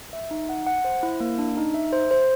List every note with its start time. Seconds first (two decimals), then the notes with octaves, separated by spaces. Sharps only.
0.13 E5
0.31 D#4
0.49 F#5
0.67 F#5
0.85 C5
1.03 E4
1.20 A#3
1.38 D4
1.57 D#4
1.74 E5
1.93 C5
2.11 C5